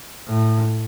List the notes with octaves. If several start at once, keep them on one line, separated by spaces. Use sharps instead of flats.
A2